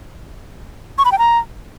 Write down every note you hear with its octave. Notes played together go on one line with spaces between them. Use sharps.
C#6
B5
G5
A#5